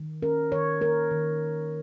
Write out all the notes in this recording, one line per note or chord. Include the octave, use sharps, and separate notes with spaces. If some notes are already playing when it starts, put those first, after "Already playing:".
Already playing: D#3
C#4 A#4
D#3 C#5
A#3 A#4
D#3